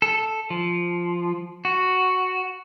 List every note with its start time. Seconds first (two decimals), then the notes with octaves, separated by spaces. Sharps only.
0.02 A4
0.50 F3
1.65 F#4